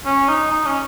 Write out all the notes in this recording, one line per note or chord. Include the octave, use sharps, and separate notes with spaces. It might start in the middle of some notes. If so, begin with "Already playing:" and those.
C#4
D#4
D#4
C#4